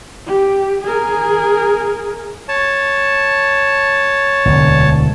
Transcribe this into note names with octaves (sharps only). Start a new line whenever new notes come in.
G4
G#4 A#4
C#5 A5
E1 D2